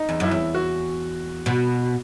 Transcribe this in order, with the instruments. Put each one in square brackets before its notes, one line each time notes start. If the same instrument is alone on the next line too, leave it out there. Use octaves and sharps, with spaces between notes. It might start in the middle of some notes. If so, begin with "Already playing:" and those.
Already playing: [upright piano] D#4
[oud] E2
[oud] F#2 [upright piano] E4
[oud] E2
[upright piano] F#4
[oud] B2